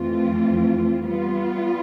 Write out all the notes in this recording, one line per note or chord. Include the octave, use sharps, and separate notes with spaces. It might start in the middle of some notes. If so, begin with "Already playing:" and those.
Already playing: F2 E3 A3 C4 F4
G3 B3 F4